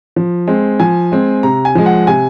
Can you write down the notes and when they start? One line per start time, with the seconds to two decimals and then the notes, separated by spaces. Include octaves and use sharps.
0.16 F3
0.47 G#3 C4
0.80 F3 G#5
1.12 G#3 C4
1.43 C3 A#5
1.65 G#5
1.75 F3 G#3
1.86 F#5
2.07 C3 G#5